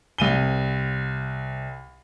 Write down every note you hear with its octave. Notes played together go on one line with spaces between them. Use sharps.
C2 D#7 G7